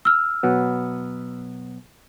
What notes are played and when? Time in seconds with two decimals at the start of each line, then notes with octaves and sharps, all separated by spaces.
0.05 E6 F6
0.43 B2 F#3 B3